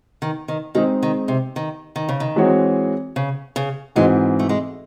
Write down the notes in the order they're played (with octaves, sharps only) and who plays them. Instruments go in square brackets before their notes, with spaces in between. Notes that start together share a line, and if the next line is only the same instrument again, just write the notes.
[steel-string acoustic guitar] D#3
D#3
[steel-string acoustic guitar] D#3 [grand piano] G#3 C4 D#4 G#4 D#5
[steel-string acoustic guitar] D#3
C3
D#3
D#3
C#3
D#3
[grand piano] E3 G#3 C4 F#4 C#5
[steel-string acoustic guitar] C#3
C#3
[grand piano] G#2 E3 C4 F#4 [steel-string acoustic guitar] G#3
[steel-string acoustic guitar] A3
G#3